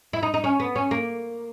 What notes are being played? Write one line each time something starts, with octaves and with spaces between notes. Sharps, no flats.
E4
D#4
D#4
C#4
B3
C#4
A#3